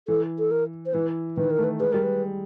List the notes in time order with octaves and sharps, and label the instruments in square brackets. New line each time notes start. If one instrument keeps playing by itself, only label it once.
[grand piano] E3 [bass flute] A4
[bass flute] A4
A#4
C5
[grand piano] E3 [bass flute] B4
[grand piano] D#3 [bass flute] B4
[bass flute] A#4
[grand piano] A3
[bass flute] B4
[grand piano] G#3 [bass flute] B4
[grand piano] G3 [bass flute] A#4
[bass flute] B4